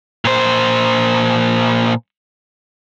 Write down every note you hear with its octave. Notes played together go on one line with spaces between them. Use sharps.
A#2 C5